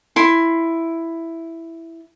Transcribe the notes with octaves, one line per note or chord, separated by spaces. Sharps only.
E4 C6